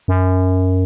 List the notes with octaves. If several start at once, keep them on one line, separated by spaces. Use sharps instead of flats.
F#2